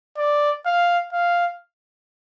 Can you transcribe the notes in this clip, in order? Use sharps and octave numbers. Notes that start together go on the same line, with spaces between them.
D5
F5
F5